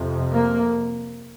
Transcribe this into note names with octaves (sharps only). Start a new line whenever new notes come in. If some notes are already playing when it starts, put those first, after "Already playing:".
Already playing: F2 C3
A#3